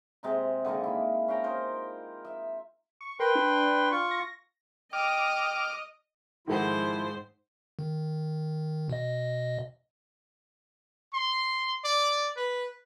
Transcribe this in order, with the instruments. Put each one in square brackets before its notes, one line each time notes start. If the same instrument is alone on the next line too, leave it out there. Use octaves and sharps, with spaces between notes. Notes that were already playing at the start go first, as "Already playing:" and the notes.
[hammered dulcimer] C3 G#3 A#5
D3 D#3 G#3 A#3
E4
C#4 F5 G5 A#5
D#4 F4 A#4 C5
E5
[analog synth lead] C#6
[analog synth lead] A#4 [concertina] B4 G5 C6
[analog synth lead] D4
[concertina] F4 C#6
[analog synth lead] A#6
[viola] D#5 [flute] G5 [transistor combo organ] D6 F6
[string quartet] G#2 C5 [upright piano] D#3 A4 F#5 [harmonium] F3 E4 F4
[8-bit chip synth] D#3
B2 D#5
[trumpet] C6
D5
B4